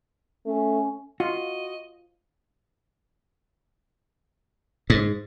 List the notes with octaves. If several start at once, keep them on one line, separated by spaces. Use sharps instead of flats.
A3 C#4
F4 F#4 D#5
G#2